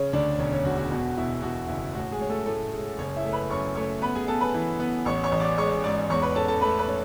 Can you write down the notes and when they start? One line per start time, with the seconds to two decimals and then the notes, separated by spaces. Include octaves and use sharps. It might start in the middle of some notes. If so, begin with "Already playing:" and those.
Already playing: C#3 C#4 C#5
0.13 D2 D4 D5
0.39 E1 C#4 C#5
0.51 C#4 C#5
0.65 E1 F#4
0.78 F#4
0.91 B2 F#4
1.17 B2 E4
1.42 B2 F#4
1.68 F#1 E4
1.94 A2 F#4
2.12 G#3 G#4
2.21 C#4
2.29 A3 A4
2.46 A2 A3 A4
2.72 G#3
2.98 F#1 C#4 C#5
3.16 E4 E5
3.25 A3
3.33 B4 B5
3.50 F#2 C#5 C#6
3.76 A3 C#5 C#6
4.02 B3 B4 B5
4.15 G#4 G#5
4.28 B3 A4 A5
4.41 B4 B5
4.54 E3
4.79 B3
5.05 A1 C#5 C#6
5.24 C#5 C#6
5.32 A1
5.40 D5 D6
5.58 G#3 C#5 C#6
5.84 G#2 D5 D6
6.10 E2 C#5 C#6
6.22 B4 B5
6.35 C#4 A4 A5
6.48 A4 A5
6.61 A3 B4 B5
6.79 B4 B5
6.88 C#4